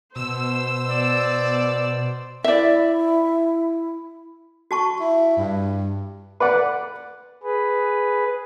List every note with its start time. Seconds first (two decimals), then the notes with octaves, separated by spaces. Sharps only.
0.16 B2 C5 E6
0.91 D5
2.44 E4 D5 E5
4.71 F#4 A5 C#6
5.00 E4
5.37 G2
6.40 B4 D5 F#5
7.43 G#4 B4